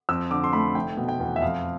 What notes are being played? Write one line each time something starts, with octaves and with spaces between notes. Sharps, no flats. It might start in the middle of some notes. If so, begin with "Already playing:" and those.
F2 E6
D3 D6
C6
A3 B5
F1 G5
B2
G5
E2
E5
F2 F5